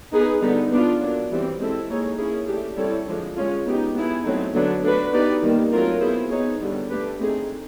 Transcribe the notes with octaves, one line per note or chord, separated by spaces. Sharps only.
B3 D#4 G#4 B4
D3 G3 B3 D#4
B3 D4 F4
F#3 A#3 D4
E3 G3 C4
G#3 C4 E4 A4
A#3 D#4 G#4 C#5
A#3 C#4 E4 G#4
A3 D4 G4
G3 C4 E4 A4 C#5
D3 F3 G#3
G#3 C#4 F4
B3 D#4 G4
B3 E4 G#4
F#3 A3 C4 D#4
D3 F#3 B3 D4
A3 D4 F#4 B4
B3 D#4 G4 B4 D5
D#3 G3 A#3
F#3 A3 C4 F4 A#4
B3 E4 G#4 C5
B3 D#4 G#4 C#5
D3 G3 B3
A3 D4 G4 B4
A3 C4 D#4 G#4